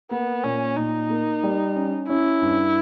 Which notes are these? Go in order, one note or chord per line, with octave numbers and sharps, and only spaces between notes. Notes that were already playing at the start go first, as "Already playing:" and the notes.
A#3 B3
A#2 C#4
A#2 D#4
A#3
G3
C#4
C#4 E4
G2